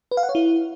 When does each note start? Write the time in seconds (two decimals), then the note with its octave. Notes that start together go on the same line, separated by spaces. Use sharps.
0.11 B4
0.17 F5
0.23 F#5
0.29 C#5
0.35 E4